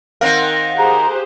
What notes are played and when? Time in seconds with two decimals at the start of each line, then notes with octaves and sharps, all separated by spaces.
0.21 D#3 C4 A#4 F5 F#5 F#6
0.78 G4 G#4 C5 A#5